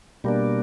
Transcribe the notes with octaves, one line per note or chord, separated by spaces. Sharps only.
B2 G3 A#3 D4